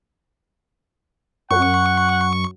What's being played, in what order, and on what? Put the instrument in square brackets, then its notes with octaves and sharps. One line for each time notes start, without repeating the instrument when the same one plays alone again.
[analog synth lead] F#2 [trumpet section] F#5 [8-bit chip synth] C#6